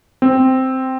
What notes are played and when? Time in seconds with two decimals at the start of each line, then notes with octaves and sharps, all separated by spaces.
0.22 C4